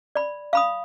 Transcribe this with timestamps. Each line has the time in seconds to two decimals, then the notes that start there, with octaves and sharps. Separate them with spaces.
0.15 D5 B5
0.53 F5 B5 D#6